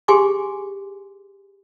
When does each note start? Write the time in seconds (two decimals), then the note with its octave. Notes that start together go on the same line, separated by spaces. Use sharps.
0.08 G4 G#4 G#5 C6 D6